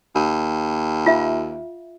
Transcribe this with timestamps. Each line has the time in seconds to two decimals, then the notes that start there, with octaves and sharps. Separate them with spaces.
0.16 D#2
1.06 F4 E5 F5